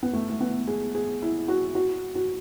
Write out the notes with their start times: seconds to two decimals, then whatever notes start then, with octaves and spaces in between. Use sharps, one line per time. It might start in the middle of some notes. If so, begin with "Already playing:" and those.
0.03 B3
0.13 A3
0.30 A3
0.40 B3
0.67 G#4
0.95 G#4
1.22 E4
1.48 F#4
1.75 F#4
2.15 F#4